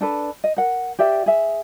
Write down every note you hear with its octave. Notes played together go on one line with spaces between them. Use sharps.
D4 A4 B4
D#5
A#4 F#5
G4 D5 E5 G5
G#4 E5